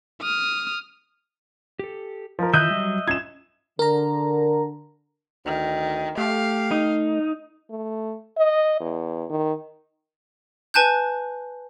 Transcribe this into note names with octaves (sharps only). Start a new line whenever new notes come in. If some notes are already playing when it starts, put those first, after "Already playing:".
D#6 F6
G4 A4
F3 A#4
D#3 E3 F4 D#5 E5 F#6 G6
F#3 G3
C#4 F4 G#6 E7
D3 A#4 A#5
D2 D#3
A3 G4 F5
D#4
A3
D#5
E2
D#3
B4 G#5 A5 F#6 G6